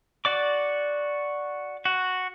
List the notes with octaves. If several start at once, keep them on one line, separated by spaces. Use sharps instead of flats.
F#4 D5 D6
F#4